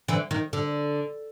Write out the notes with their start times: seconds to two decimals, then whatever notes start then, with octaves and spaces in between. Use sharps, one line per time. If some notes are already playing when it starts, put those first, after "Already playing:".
0.08 D3 E3
0.31 D#3
0.53 D3